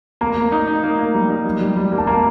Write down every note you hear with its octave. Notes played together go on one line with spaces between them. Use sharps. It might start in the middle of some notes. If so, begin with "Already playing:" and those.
A#3 A#5
A#3
D#4
D#4
A#3
A#3
G3
D#4
G3
G3
G3
A#3
A5
A#3 A#5